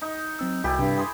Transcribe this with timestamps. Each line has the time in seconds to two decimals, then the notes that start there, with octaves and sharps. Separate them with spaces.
0.02 D#4
0.39 F#3 C4 E6
0.64 C2 E4 F#4 G4 A4 G#5
0.79 G2 C3
0.98 G#4 B5 C6 D#6